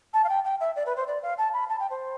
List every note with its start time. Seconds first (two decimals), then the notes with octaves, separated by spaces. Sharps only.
0.14 A5
0.24 F5
0.29 G5
0.45 G5
0.60 E5
0.76 D5
0.86 B4
0.96 C5
1.07 D5
1.23 F5
1.38 A5
1.53 B5
1.69 A5
1.80 G5
1.90 C5